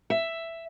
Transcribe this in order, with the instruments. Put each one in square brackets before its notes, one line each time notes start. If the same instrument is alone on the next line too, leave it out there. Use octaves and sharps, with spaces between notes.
[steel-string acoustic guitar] E5